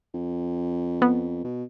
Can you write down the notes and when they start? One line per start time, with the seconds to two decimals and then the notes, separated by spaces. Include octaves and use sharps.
0.14 F2
1.02 B3
1.44 B2